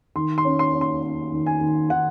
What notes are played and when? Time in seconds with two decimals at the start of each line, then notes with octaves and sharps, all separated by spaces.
0.16 D#3 C6
0.38 C6
0.45 C#4
0.59 C6
0.74 C#4
0.81 C6
1.03 C#4
1.32 D#3
1.46 G#5
1.61 D#3
1.90 D#3 F#5